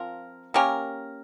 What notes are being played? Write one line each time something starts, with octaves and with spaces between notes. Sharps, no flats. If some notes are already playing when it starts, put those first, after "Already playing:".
Already playing: F3 C4 F4 A#4
A#3 C#4 G4 A#4